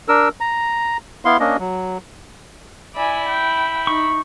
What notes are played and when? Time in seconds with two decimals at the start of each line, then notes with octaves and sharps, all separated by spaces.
0.08 D4 A#4 E6
0.41 A#5
1.25 B3 E4 F5 C6
1.40 A#3 C#4 D4 D#5
1.59 F#3
2.95 E4 D5 G#5 B5
3.29 G5
3.87 D#4 C#6